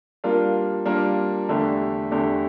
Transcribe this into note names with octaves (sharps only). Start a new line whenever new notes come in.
G3 A#3 D4 F4 A#4
G3 A#3 D4 F4 A#4
E2 D3 A3 D4 G4
E2 D3 A3 D4 G4